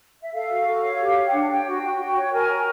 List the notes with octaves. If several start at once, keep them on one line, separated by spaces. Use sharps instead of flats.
E5
A4 F5
F#4
A4
C#5
G4
C#5
G5
D4 F#5
C#5 G5
F#4
F#4
F#4
C#5
A#4 G#5
F#4